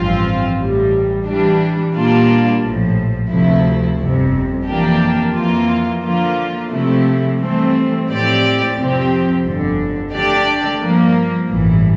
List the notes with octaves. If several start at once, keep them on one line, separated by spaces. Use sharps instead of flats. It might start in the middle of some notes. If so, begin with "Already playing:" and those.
Already playing: A1 G2 F3 C4 F4
A1 A2 G3
E3 G3 D4
A#2 G3 A#3 D4 F4
A#1 A2 F3
D2 C3 F3 A3 E4
G1 F2 C3
F2 E3 A#3 D4 G4
F2 E3 A#3 F4
D3 F3 A#3 F4
C3 F3 A3 E4
G2 E3 A3 C4
A2 F3 C4 G4 D5
F2 C3 F3 C4 G4
G1 F2 D3
D3 A3 D4 G4 D5
G2 F3 A#3
A1 G2 E3